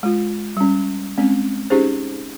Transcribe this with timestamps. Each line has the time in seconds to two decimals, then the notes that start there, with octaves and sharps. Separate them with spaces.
0.03 G#3 F4
0.57 G3 C#4
1.18 G#3 C4 C#4
1.70 C#4 D#4 G4 G#4 C5